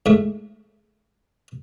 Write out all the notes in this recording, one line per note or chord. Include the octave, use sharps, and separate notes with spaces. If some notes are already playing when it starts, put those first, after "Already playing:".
G#2 A3